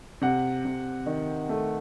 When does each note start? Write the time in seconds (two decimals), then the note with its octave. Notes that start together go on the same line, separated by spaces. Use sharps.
0.21 C3 F#5
0.65 C3
1.06 D#3
1.49 A3